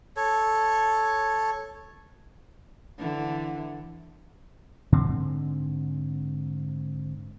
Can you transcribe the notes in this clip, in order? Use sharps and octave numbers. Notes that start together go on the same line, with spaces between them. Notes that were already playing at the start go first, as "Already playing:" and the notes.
A4 C#5
D3 E3
G#2 D3 C4